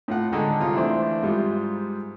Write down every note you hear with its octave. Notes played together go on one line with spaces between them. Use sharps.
A2 F4 F#5
D3 D#3 G#3 D#4 A4
C2 F4 D#6
E3 A3 D4 C5
G#2 G3 F4